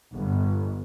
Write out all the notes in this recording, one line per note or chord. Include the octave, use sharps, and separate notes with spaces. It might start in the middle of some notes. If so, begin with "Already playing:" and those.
G1